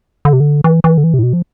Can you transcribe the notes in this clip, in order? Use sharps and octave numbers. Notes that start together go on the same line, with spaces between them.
D3
C3
D3
E3
E3
D3
E3
C3
A2
B2
F3